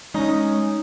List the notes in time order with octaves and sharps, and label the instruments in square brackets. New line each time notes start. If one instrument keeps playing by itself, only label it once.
[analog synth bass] G#3 [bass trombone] C#4 [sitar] D#4